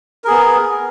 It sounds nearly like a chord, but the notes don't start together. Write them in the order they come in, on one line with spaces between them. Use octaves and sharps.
A#4 G#4 B3